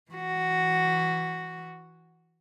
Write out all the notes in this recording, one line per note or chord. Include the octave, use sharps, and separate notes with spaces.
E3 F#4